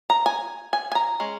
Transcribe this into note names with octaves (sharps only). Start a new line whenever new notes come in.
A#5
G#5
G#5
G#5
A#5
G#3 C#4